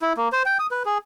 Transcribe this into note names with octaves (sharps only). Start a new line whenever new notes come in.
E4
A#3
C5
G5
D#6
B4
G#4